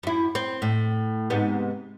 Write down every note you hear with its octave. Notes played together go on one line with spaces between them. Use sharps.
F#2 E4
C4
A2
G#2 C3 B3